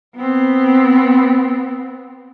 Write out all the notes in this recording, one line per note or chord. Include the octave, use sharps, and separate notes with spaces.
B3 C4